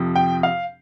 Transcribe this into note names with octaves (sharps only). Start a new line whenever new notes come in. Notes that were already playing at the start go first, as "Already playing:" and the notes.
Already playing: F2 C3 F3
G5
F5